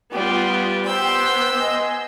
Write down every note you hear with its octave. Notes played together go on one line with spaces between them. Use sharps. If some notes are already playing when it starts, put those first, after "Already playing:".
G3 B3 F4
B3 G4 C5 E6 G6
D#5 G#5 C6